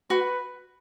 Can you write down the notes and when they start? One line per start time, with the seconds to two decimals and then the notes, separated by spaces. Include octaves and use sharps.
0.10 F#4 B4